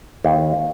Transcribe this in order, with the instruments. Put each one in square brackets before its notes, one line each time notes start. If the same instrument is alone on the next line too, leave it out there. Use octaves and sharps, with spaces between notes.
[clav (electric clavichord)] D#2